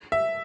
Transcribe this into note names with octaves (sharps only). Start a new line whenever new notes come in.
E5